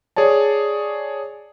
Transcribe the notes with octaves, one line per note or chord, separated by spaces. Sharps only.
G#4 C#5 D5 A5